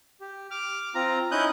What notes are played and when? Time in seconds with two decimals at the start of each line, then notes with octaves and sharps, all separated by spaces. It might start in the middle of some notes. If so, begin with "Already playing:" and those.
0.20 G4
0.51 D6 F6
0.95 C4 F4 A#5
1.31 C#4 D#4 E4 D#6 F#6 G6